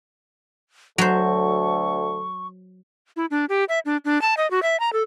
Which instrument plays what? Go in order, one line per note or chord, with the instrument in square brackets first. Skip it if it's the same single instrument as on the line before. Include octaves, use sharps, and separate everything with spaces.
[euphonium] D2 [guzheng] F#3 C5 [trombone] A4 [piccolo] C#6
[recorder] E4
D4
G4
E5
D4
D4
A5
D#5
F#4
E5
A#5
A4